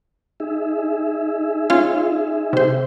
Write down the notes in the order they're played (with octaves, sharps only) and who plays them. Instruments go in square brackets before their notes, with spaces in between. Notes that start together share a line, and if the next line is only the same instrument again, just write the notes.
[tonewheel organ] D#4 G#4 E5
[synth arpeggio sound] C#4 F4 F5
C3 C5